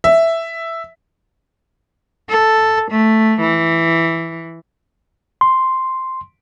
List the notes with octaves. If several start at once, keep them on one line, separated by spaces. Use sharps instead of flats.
E5
A4
A3
E3
C6